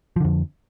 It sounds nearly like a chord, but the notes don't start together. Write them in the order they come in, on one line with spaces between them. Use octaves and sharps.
F3 D3 F2